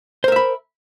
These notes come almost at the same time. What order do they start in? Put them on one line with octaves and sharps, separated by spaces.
C5 A#4 E5 B5